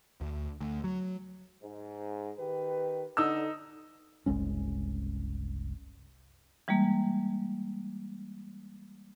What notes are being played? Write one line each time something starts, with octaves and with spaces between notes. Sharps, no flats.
D2
D2
F#3
G#2
D#3 G4 B4
D3 D#4 E6
F#1 C2 G#3 C#4
E3 G3 G#3 A#3